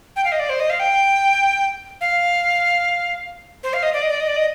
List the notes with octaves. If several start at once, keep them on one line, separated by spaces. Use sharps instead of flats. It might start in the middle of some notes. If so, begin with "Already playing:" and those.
G5
F5
D#5
D5
C5
D#5
F5
G5
F5
C5
F5
D#5
D5
D#5
D5
D#5
D5
D#5